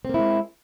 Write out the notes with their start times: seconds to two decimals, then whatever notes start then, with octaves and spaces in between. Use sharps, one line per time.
0.05 C4
0.09 A#3
0.14 E4
0.19 G#3